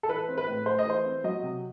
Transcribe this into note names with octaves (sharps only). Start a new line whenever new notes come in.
A4
E3 B4
C4
B4
A2
A3 C5
D#5
E3 C5
C4
F#3 D#5
C3